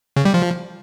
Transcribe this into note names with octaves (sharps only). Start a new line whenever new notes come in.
C#3
G3
F3